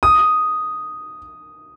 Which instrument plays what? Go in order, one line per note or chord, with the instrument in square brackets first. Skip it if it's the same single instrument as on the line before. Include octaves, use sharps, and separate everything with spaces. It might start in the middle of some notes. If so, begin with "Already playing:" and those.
[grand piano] D#6